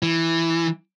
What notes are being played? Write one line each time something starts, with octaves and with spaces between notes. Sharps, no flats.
E3